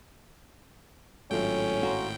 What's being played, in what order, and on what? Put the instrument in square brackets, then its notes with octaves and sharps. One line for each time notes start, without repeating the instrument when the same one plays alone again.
[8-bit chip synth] G#1 A2 G5 [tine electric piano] F#3 F4 F#4 [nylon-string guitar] A3 [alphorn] C#4
[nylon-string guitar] F#4 [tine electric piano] F5 A#5 C6